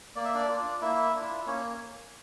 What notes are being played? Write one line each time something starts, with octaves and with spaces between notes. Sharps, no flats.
A#3 D5
E5
D4 D5
D4 F4
A#3 E4 E5
D4 F4
A#3 C#4 C#5